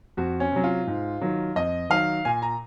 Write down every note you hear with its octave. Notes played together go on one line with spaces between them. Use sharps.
F2 F#4
C#4
C3 F#3
F4
G#2
D#3 F#3
F2 D#5
D#3 F#3 F5
A#2 G#5
A#5